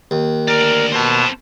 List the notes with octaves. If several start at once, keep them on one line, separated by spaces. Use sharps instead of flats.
D#2
D2 A#4 D5
B2 C4 A5